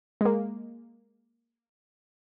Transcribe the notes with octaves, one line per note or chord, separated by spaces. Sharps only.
G#3 A#3